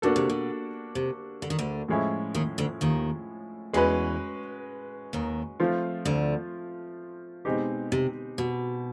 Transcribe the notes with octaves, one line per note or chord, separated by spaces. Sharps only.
B2 A#3 D4 F#4 A4
C3
B2
C3
D3
D#3
D2 D3
A2 F3 G#3 C#4 E4
D#2 D#3
D2 D3
D#2 D#3
E2 E3 G#3 C#4 F#4 B4
D#2 D#3
F3 A3 C4 F4
D2 D3
B2 G#3 C4 D#4 G4
C3
B2